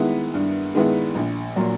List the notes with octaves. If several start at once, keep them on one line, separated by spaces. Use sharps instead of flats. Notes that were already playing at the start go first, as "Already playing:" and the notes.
Already playing: D#3 G#3 B3 E4
G2
D#3 G#3 B3 E4
A#1
A#2 F#3